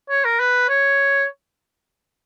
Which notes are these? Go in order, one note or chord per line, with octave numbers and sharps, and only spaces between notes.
C#5
A#4
B4
C#5